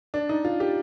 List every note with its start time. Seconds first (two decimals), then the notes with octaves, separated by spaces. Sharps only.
0.14 D4
0.29 D#4
0.44 F4
0.60 G4